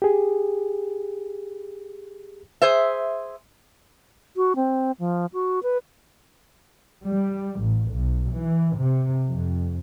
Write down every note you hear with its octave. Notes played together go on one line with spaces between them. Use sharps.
G4 G#4
G#4 C5 E5
F#4
C4
F3
F#4
B4
G3
A1
B1
E3
C3
F2